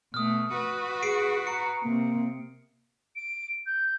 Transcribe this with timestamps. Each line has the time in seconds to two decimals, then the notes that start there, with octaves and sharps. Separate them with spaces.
0.14 B2 A3 D#6 F6
0.54 F#4 B4
1.03 G#4 C7 D7
1.47 A#5 C#7
1.84 C3 A#3
3.16 D7
3.66 G6